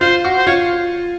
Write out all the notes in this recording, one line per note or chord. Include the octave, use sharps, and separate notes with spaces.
F4 C5
F#4
C5
F4 C#5